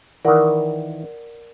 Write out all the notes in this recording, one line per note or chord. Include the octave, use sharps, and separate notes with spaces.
D#3 E3 A#4 D5 F#5